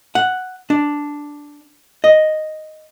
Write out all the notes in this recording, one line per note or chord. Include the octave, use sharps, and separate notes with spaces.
F#5
D4
D#5